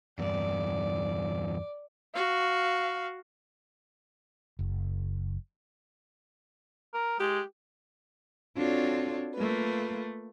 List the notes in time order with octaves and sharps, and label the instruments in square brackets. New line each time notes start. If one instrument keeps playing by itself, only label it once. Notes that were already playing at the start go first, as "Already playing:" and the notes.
[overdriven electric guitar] E2 G2 [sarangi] D5
[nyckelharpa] F#4 [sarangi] F5
[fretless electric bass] F#1
[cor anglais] A#4
[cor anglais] G#3 [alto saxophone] G4
[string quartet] C4 D4 F4 F#4 A4 C#5
A3 A#3 F4 B4